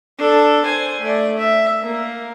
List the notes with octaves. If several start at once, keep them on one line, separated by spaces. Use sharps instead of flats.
D4 A4
C5 G#5
A3 D5
E5
A#3